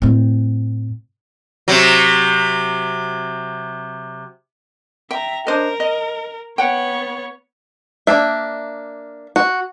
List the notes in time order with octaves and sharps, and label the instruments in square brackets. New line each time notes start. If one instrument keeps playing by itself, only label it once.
[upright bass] A2 C4
[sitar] C3 F#3
[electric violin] E5 A#5 [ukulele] G5
[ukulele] D4 C5 D#5 [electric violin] A#4
[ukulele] D#5
[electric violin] B3 C#5 [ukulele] F#5 G5
[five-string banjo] A#3 D4 E5
F#4